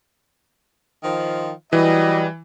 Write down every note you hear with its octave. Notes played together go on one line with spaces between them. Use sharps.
D#3 F3
E3 F#3 G3 D#5